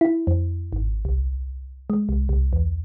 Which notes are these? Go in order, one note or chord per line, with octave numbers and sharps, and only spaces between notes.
E4
F2
G#1
C2
G#3
C2
C2
E2